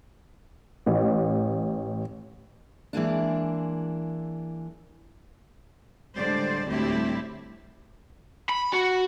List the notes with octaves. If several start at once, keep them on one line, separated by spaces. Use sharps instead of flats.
A1
E3 G#3 A#3 D4
A2 D3 G3 G#3 C5 D5
D2 A2 G3 C4 E4 G4
B5
F#4